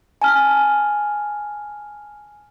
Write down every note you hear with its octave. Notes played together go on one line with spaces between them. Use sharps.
G#5 A5 F6